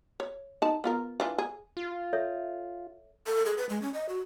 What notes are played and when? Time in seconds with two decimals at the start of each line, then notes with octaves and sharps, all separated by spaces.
0.20 C#5
0.62 D#4 A5
0.84 B3 F4 A#4
1.20 E3 D4 F4
1.38 G#4
1.77 F4
2.13 A4 C#5 E5
3.27 A4
3.46 G#4
3.58 B4
3.69 G#3
3.82 C#4
3.94 D#5
4.09 F#4